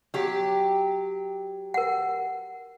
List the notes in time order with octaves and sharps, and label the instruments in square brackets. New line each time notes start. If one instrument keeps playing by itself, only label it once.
[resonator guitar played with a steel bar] F#3 G4
[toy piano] A#4 F#5